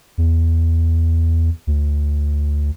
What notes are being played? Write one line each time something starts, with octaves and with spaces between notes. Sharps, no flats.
E2
D2